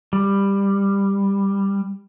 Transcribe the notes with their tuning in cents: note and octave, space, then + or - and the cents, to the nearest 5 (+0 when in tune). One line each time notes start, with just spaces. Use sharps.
G3 +15